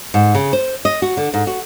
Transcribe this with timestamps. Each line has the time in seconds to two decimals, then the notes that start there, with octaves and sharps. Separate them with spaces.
0.14 G#2
0.35 C#3
0.53 C5
0.85 D#5
1.02 F#4
1.17 D3
1.34 G#2
1.47 F#4